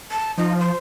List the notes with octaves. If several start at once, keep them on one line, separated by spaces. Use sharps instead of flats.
A5
F3 D#4
C5